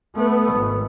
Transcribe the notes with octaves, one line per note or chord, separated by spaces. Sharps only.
A3 B3
G#1